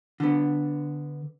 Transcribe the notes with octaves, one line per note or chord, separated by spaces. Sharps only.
D3 B3